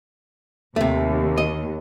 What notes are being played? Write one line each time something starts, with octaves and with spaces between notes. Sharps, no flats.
D#2 C3 A3
D#5